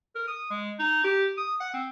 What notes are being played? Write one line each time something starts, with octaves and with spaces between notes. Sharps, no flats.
A#4
D#6
G#3
D#4
G4
D#6
F#5
C4